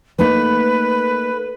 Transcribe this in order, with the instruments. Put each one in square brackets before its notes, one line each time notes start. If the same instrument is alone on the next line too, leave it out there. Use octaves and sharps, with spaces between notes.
[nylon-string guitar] A3 A#3 D#4 [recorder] B4